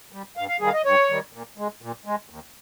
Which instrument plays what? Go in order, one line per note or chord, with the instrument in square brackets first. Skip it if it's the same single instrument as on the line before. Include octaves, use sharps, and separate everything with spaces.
[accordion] G3
G2 F5
F5
D#3 G3 G#4
F5
D#5
G2 C#5
D#3 G3
A#2
G#3
A#2
G#3
D#2